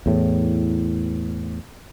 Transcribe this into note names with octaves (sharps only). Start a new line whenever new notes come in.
E2 A2